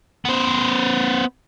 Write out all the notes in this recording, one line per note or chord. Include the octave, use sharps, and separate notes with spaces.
B3 C5